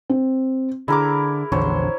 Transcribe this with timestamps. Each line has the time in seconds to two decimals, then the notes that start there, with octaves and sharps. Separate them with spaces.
0.09 C4
0.88 D3 E4 G#4 A#4 D6
1.52 A#1 E2 D3 C5 C#5